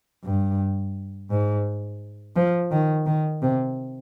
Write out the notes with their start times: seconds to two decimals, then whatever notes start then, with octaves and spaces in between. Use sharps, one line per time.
0.25 G2
1.30 G#2
2.36 F3
2.71 D#3
3.06 D#3
3.42 C3